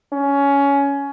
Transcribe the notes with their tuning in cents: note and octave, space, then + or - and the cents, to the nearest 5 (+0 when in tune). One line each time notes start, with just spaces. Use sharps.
C#4 +15